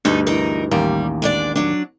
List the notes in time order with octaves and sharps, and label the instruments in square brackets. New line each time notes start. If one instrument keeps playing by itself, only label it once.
[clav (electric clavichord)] D2 G2 [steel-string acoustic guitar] A3 D#4
[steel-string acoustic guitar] E3 D#4 A#4
[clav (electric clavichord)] A1 D#2 A#3 [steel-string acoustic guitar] G3
[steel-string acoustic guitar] G#3 D4 D5
F#3 D4